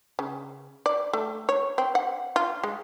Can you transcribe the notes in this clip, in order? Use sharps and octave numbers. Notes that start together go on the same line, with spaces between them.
C#3
D5
A3
C#5
C4
F#5
F4
G#3